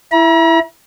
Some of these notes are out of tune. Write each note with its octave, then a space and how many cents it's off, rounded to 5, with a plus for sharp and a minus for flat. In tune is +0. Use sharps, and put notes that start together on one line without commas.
E4 +5 A#5 +45